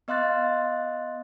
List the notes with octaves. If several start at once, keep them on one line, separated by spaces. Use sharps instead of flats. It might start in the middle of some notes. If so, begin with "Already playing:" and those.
B3 D#5 F5 C6 F#6 A6